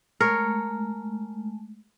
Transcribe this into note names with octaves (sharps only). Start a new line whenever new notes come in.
G#3 A3 A#4 C#5